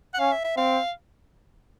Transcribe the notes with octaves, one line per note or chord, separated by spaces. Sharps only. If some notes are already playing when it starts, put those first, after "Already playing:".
F#5
C#4 F5
E5
E5
C4 F5